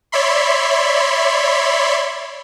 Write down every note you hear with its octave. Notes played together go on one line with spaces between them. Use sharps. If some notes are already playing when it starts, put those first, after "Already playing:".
C#5 D5 E5 B5 C6